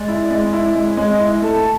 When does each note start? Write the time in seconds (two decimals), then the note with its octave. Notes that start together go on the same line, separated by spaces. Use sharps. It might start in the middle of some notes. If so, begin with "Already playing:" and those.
Already playing: G#3 D5
0.08 E4
0.31 G#3
0.53 E4
0.75 G#3 C#5
0.97 G#3
1.08 D#5
1.19 E4
1.42 A3 A5